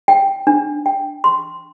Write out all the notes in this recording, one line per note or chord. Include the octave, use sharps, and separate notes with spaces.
G5
D4
G5
C6